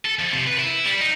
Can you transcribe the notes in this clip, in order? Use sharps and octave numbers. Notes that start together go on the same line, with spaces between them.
A4
F2
C3
B4
E4
G3
D#4